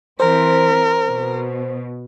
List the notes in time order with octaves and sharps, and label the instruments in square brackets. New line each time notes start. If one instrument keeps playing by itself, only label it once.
[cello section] E3 C4 [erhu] A#4 [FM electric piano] C5
[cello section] B2